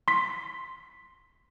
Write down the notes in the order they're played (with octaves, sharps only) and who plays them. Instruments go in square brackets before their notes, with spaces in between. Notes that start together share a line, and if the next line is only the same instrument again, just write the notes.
[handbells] C6 B6